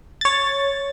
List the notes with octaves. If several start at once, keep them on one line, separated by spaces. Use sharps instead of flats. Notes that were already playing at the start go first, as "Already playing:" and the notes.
C#5 A6